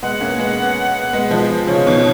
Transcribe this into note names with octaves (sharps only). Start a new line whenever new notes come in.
G#3 B3 F#5
A#3 C#4
G#3 B3
G#3 B3
F3 G#3
C#3 F3 C#5
B2 D#3